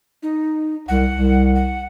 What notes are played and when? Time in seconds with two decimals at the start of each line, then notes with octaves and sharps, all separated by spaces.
0.23 D#4
0.88 C2 F#5
1.11 C2
1.55 F#5